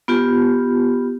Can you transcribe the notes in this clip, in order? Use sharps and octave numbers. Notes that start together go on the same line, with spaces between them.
B3 F4 G4